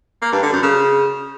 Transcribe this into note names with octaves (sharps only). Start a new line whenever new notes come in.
A#3
G2
D3
F#2
C#3